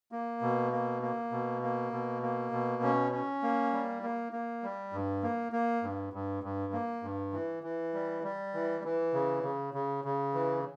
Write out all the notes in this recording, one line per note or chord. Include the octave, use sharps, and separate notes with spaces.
A#3
B2
A#3
A#3
B2
A#3
B2
A#3
B2
C#4
C#4
A#3
G3
A#3
A#3
G3
G2
A#3
A#3
G2
G2
G2
A#3
G2
E3
E3
G3
G3
E3
E3
C#3
C#3
C#3
C#3
E3